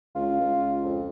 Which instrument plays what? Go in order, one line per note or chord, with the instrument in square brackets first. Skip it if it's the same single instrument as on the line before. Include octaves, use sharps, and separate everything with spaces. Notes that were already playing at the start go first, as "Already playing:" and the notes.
[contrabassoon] C#2 [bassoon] F4
[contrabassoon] C#2
[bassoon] F2